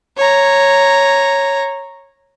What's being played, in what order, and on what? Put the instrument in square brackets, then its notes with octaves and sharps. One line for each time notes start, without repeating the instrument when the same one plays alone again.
[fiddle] C#5 A#5